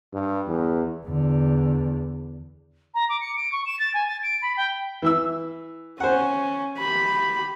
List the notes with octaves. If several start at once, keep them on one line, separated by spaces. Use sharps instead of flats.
G2
E2
E2 D3
A#5
D6
C#7
D7
C#6
E7
A6
G#5
A6
D7
B5
G5
E3 E5 E6
C#4 C5 F#5
G4 B5